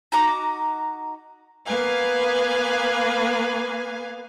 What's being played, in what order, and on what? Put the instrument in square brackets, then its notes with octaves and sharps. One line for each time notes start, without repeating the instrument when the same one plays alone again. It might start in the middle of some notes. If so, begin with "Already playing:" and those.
[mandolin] D#4 F#4 A#5 D6
[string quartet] A#3 B3 B4 F5 G#5